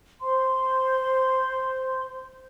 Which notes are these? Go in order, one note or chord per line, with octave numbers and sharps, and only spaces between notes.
C5 C6